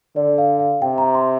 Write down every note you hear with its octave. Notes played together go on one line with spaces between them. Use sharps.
D3 D5
F5
F5
C3 G5
A#5
C6